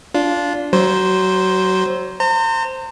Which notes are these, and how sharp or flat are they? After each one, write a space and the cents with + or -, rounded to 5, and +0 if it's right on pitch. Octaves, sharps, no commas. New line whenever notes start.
D4 -15 F4 +0
F#3 +25 C5 +0
C5 +0 A#5 -40